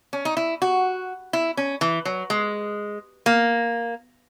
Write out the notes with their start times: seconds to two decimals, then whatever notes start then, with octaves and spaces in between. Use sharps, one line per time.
0.13 C#4
0.25 D#4
0.37 E4
0.62 F#4
1.33 E4
1.57 C#4
1.81 E3
2.05 F#3
2.30 G#3
3.26 A#3